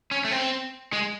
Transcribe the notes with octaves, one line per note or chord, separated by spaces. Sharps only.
C#4
A3
C4
G#3